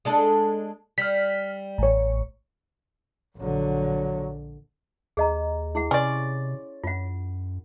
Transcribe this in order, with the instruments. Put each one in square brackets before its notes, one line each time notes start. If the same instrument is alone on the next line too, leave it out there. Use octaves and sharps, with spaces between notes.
[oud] G#3 D4 A4
[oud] G3 [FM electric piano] F6 B6
[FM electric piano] A1 C#5
[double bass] A#1 D3 [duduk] F#3
[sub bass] D#2 [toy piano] G#4 D#5 A#5
[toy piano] E4 G#4 F#5
[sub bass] C3 [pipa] C#4 D5 [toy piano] C6 C#6
[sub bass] F#2 [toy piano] F4 F#5